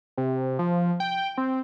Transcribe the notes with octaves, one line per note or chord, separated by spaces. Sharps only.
C3
F3
G5
C4